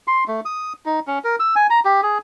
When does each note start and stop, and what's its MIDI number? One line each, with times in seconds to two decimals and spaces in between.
0.08 0.24 84
0.28 0.40 57
0.45 0.73 87
0.86 1.00 63
1.07 1.19 61
1.24 1.36 70
1.40 1.55 88
1.56 1.67 80
1.70 1.80 82
1.85 2.01 67
2.03 2.18 68